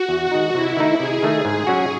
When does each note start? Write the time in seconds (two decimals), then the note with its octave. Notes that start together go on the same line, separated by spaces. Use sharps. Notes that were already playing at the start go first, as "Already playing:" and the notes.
Already playing: F#4
0.09 E2
0.31 D#3 G#3 D#4
0.54 C3 E4
0.77 D#3 A3 D#4
0.99 C3 G#4
1.23 D#3 A3 D#4
1.45 G#2 G#4
1.67 F#3 C#4 F#4